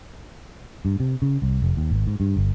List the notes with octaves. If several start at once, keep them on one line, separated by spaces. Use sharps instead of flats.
G2
C3
C#3
C2
F1
D#2
G#1
G#2
G2
G1